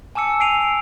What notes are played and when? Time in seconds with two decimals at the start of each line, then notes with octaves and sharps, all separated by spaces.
0.15 G#5 A5 D6 E6 C#7
0.40 G#5 C7 D7 D#7 F7